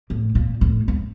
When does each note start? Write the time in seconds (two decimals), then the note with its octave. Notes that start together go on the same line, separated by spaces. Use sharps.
0.10 A2
0.35 A#2
0.61 A2
0.88 G#2